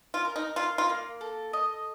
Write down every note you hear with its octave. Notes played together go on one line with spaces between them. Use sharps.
F4
A#4
D#4
F4 F5
F4
A#3
A4
D#5